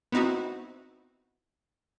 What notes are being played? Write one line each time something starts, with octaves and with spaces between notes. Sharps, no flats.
B3 C4 D#4 E4 F#4